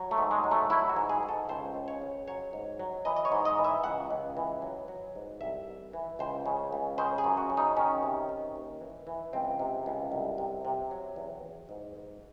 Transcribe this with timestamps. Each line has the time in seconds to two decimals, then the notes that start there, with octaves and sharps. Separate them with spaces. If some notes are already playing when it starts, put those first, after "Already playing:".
Already playing: F#3
0.11 A3
0.18 G#2
0.31 G#3
0.44 F#3
0.51 A3
0.70 F#3 E4
0.89 F#4
0.96 G#2
1.09 G#4
1.23 G#2
1.29 A4
1.49 C#2 C5
1.74 C#3
1.88 C#5
2.02 C#3
2.27 F#3 C#5
2.53 G#2
2.79 F#3
3.05 E3 D#5
3.16 D#5
3.25 C#5
3.32 G#2
3.45 D#5
3.59 E3
3.64 E5
3.84 C#2 F#5
4.11 C#2
4.37 E3
4.62 F#3
4.88 F#3
5.15 G#2
5.41 C2 E5
5.67 E3
5.93 E3
6.19 C#2 C5
6.46 C#3
6.73 C#2
6.98 C#3 C5
7.18 G#4
7.24 F#2
7.37 F#4
7.50 C#3
7.57 D#4
7.77 D#3 C#4
8.03 C3
8.29 D#3
8.56 D#2
8.81 E3
9.07 E3
9.33 C#2 C4
9.59 C3
9.86 C#2
10.12 C2
10.38 C3
10.65 C3
10.91 F#3
11.16 E2
11.43 E2
11.69 G#2
11.96 G#2